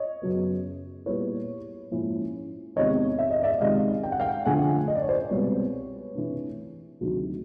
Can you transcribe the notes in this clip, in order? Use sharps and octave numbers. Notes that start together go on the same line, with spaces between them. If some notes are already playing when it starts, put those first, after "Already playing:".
Already playing: C#5 D#5
F#2 C#3 F#3 B3
A#2 G3 B3 E4 B4 C#5
G#2 F3 A#3 C#4 E4
E2 C3 D#3 G#3 C4 C#5 D#5
E5
D#5
D5 E5
C#2 C3 D#3 G#3 D#5 F5
G5
F#5
F5 G5
D3 F3 A3 D4 F4 F#5 G#5
D#5
D5
C#5
C5 D5
C2 B2 G#3 C4 B4 C#5
C3 E3 A3 D4
D2 C3 D#3 F#3